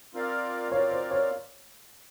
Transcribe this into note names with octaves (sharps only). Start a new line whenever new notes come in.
C4 F4 A#4 D5 F5
C4 F4 A#4 C#5 D5 F5
C5
C#5